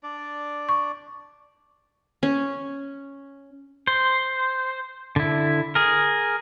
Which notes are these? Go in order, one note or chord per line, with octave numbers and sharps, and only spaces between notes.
D4 D5
C#6
C#4
C5
D3 E4
G#4 A#4